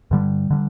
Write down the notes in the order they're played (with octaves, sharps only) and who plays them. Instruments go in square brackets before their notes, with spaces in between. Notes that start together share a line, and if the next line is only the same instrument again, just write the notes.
[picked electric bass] G2 D3 G3
D3 G3